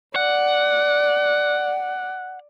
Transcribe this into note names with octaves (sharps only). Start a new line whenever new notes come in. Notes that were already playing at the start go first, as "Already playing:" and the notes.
D5 F#5